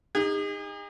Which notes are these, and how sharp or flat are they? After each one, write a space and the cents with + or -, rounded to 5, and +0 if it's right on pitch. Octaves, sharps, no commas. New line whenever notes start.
D#4 +0 G#4 -45